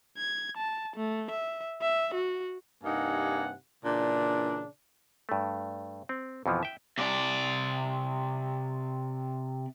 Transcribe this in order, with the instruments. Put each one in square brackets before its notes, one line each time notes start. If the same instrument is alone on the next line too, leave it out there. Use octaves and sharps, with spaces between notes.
[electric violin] G#6
A5
A3
E5
E5
F#4
[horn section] G2 C3 A#3 D#4 F#5 G#5
A#2 C#3 E3 D4
[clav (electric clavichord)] G2 A3
C4
F2 B2 E3 F3
E5 G5
[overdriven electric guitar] C3 D5